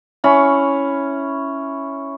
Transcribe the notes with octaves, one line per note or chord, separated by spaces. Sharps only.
C#4 E4 B5 C#6